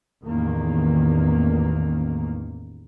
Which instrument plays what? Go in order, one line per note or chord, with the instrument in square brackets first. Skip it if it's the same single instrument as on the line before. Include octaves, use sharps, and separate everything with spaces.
[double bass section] A1 E2 D#3 A#3